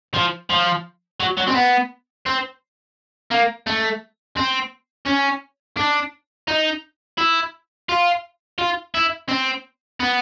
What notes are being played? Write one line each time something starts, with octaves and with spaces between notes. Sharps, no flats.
F3
F3
F#3
F#3
C4
B3
C4
A#3
A3
C4
C#4
D4
D#4
E4
F4
F4
E4
C4
B3